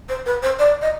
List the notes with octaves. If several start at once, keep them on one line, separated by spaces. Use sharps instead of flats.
C5
B4
C5
D5
D#5